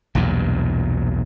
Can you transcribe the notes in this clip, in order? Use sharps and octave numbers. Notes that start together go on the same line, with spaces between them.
B1 E2 G2 A#2